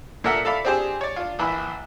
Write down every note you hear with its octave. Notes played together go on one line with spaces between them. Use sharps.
A#2 D4 A4 A#4 E5 F#5
A4 D5 E5 F5 B5
C4 D4 G4 G#4 C5
C#5 D5
D4 F4
A#1 E3 B5